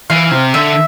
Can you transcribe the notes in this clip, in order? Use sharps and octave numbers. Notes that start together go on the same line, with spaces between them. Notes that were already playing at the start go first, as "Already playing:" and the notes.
E3 F5
C3
D3 E5